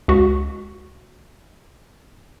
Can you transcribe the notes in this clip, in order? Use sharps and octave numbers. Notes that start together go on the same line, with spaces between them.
C#2 F#4